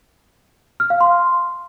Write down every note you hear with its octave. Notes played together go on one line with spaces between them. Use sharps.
F6
F5
C6